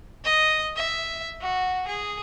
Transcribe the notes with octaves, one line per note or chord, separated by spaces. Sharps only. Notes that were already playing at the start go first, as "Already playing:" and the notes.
D#5
E5
F#4
G#4